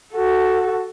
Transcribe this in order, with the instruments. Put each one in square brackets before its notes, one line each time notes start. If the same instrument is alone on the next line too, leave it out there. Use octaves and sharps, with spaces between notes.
[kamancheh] F#4 A4